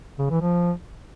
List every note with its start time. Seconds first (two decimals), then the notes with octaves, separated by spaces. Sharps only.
0.19 C#3
0.30 E3
0.41 F3